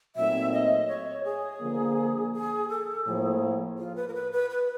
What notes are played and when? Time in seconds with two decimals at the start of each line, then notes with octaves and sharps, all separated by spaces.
0.16 A#2 F#3 A3 C4 D#4 E5
0.52 D#5
0.88 C#5
1.24 G#4
1.61 D3 F3 A#3
2.33 G#4
2.69 A4
3.05 A2 F3 A#3 G#4
3.78 F4
3.96 B4
4.08 A#4
4.14 B4
4.32 B4
4.50 B4